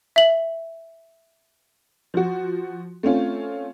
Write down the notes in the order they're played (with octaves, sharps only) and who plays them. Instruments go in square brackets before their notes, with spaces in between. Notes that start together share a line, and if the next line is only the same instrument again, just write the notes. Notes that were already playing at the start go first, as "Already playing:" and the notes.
[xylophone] E5 F#7
[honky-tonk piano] F3 F#4
A3 C4 C#4 F4